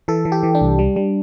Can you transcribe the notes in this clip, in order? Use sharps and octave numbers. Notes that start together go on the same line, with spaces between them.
E3 A4
E3
G4
E3
D4
C2
G3
G3